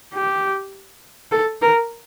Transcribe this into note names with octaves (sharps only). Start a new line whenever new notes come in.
G4
A4
A#4